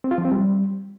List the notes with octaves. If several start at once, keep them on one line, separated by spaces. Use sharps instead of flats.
C4
F4
F3
C4
G3